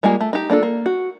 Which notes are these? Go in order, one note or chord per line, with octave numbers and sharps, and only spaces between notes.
G3 G#3 A#3 F4 G#5
A3
D#4 G4
A#3 D4 F4 A4
A#3
F#4